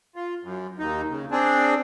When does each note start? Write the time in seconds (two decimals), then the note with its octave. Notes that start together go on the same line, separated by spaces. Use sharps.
0.16 F4
0.43 F#2
0.79 D#2 D#4
1.10 C#3
1.31 C4 D4 G#4